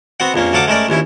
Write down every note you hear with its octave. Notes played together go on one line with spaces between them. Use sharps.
B3 C4 F#4 F#5
A#1 F2 A#3 C#4
D2 F#3 A4 F5 F#5 D6
G#3 A3 C#4 A#4 D5
A#1 D#2 C#4 E4